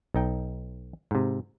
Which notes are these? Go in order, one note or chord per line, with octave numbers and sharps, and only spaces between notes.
B1 D#4 G5
G#2 C3